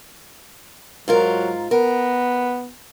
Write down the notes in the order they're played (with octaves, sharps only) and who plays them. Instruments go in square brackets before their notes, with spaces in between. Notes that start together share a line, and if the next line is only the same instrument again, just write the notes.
[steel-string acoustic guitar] G#2 F4 A#4 [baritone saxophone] F#3
[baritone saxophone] B3 [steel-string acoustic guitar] A#4